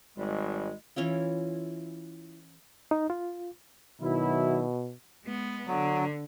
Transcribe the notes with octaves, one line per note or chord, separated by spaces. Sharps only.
G#1 G3 G#3
E3 C#4 E4 F4
D#4
F4
B2 D#3 F#3 E4
G#3 B3
D3 F#3